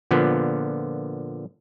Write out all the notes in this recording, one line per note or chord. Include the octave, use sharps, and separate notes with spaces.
A#2 D3 F3 B3